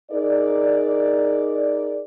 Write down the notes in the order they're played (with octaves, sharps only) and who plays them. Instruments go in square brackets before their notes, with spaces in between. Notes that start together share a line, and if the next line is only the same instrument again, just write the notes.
[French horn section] D#4 G#4 A#4 D5